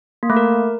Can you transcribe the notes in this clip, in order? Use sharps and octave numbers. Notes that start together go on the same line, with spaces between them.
A#3
A3
A#4